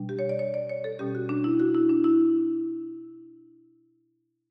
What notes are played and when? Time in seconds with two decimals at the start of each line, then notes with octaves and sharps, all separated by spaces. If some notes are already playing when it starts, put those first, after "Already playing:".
Already playing: B2 G3 D4
0.09 G4
0.19 C#5
0.29 D5
0.39 C#5
0.54 D5
0.69 C#5
0.84 A4
0.99 B2 G3 C#4 G4
1.15 F#4
1.29 D4
1.44 E4
1.60 F#4
1.74 E4
1.90 D4
2.04 E4